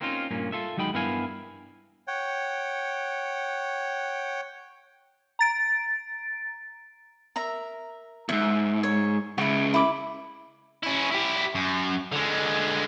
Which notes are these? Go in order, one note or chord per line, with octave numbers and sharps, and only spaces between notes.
A#3 C4 C#4 D#4 F4
G2 A#2 A#3 C#4
F4 A4 E5
D#2 F#3 G#3 D#4 G5 B5
G2 B3 E4 A#4 F5 G#5
C#5 F#5 G5
A#5 A6 D7
A#4 E5 A#5
E2 G#2 E5
C#5
C#2 C#3 E4 F#4
E4 B5 D6
C#4 E4
E4 G4
F#2
D3 G#3